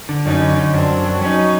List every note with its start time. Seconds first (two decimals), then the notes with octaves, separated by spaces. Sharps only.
0.09 D3
0.25 F#2 C#4 D#4
0.42 D3
0.57 D3
0.73 F#2 C4 D4
0.90 F#2
1.05 F#3
1.21 F#3 C#4 D#4